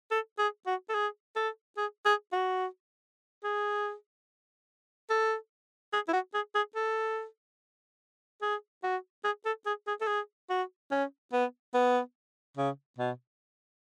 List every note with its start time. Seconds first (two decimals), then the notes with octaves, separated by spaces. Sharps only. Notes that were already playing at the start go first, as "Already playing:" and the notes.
0.11 A4
0.39 G#4
0.66 F#4
0.89 A4
0.94 G#4
1.36 A4
1.77 G#4
2.05 G#4
2.32 F#4
3.44 G#4
5.10 A4
5.93 G#4
6.08 E4
6.13 F#4
6.34 G#4
6.55 G#4
6.75 A4
8.42 G#4
8.83 F#4
9.24 G#4
9.45 A4
9.66 G#4
9.87 G#4
10.01 A4
10.07 G#4
10.50 F#4
10.91 C#4
11.32 B3
11.74 B3
12.57 C#3
12.98 B2